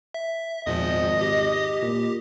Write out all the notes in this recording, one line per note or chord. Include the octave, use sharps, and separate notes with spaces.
E5
G#1 E2 A#2 F3 D#5
G4
A#2